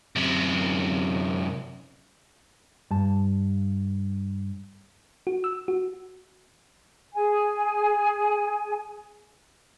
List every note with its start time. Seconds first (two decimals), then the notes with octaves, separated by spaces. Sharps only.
0.16 F#2 C3
2.91 G2 A5
5.27 F#4
5.44 E6
5.68 F#4
7.14 G#4 G#5